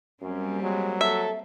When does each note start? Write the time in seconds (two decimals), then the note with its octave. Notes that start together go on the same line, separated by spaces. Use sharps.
0.22 F#2 G3 A#3 C4 C#4
0.63 F#3 G#3
1.01 A4 E5